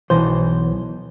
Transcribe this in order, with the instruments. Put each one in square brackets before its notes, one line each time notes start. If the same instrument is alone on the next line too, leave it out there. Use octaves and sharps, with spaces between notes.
[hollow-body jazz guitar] B1 E3 C5